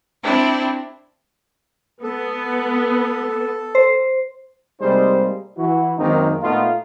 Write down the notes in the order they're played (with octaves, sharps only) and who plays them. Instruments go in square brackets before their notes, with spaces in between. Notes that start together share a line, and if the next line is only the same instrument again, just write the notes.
[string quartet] C4 D4 E4 G4
[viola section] B3 [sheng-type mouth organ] A4
[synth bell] C5
[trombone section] C3 G3 G#3 A#3 D#4 C5
E3 E4 F#4
F#2 D#3 G#3 A#3 C4 D#4
A#2 A3 B3 D#4 F4